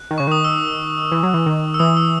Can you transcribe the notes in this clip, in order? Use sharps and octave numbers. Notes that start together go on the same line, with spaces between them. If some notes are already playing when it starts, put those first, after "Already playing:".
Already playing: F#6
D#3
C#3 C#6
D#3 D#6
E6
E3
F#3
E3
D#3
E6
E3 D#6
E6